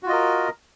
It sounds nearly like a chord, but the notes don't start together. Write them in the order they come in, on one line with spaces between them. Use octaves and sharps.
F#4 F4 D#5 A#4